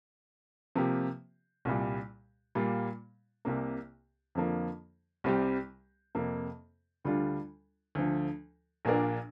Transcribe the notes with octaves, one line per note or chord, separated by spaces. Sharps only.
C3 F3 A#3 G4
C2 A#2 G3
A#2 G3 A#3 F4
C2 C3 A#3
F2 D3 F3 A#3
C2 C3 G3 C4 G4
F2 C3 A#3
D2 D3 G3 D4 F4
D2 D3 F3
A#1 A#2 A#3 D4 A#4